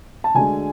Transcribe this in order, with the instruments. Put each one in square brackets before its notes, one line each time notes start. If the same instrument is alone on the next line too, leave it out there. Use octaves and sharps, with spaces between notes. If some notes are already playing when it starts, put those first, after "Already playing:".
[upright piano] A5
D2 D3 G#3 G#5